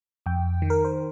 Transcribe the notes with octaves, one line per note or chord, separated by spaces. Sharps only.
F2 G5
D#3
A#4
C5